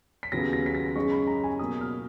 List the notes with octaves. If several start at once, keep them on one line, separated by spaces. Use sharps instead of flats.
B6
D#2 C#3 F#3 B3 A#6
A#6
B6
A#6
F#2 C#3 G#3 D#4 C#6
B5
A#5
G#5
B2 F#3 A#3 D#6
F6